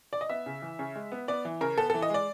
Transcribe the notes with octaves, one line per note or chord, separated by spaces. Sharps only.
D5
D#5
B3 E5
C#3
E3
C#3
G#3
B3
B3 D5
E3
C#3 A#4
B3 A4
E3 A4
D#5
G#3 D5